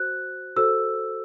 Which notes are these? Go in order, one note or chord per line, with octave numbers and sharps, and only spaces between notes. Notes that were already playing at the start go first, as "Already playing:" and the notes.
Already playing: F#4 C5 F#6
F#4 A4 C5 E6